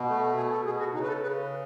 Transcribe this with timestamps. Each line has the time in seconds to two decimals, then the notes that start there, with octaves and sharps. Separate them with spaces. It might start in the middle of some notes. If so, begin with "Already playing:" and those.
Already playing: B2
0.09 A3
0.37 B2 G#4
0.52 A4
0.66 B2 G#4
0.80 F#4
0.94 C#3 D#4
1.03 B4
1.08 A4
1.22 C#3 B4